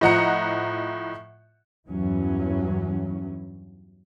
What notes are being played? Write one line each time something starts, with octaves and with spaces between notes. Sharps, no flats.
A2 F3 D#5 F#5 A#5 C#7
E2 G2 E3 F#3 C#4